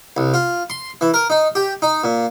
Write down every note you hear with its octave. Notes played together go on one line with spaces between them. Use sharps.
C2
F4
C6
E3
A#4
D#4
G4
D#4
A#2